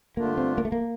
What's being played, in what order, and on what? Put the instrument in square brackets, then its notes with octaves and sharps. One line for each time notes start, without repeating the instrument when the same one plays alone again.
[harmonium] G2 D3 A3 D4 F4 [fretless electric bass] A#3
[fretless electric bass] C4
A#3
A3
A#3